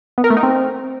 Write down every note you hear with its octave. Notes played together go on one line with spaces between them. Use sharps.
B3
A#4
A3
D#4
C4